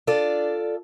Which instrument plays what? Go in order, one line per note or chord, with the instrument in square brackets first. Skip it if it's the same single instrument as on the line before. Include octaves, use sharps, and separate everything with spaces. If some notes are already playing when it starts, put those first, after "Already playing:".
[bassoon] D4 [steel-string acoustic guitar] F4 A4 D5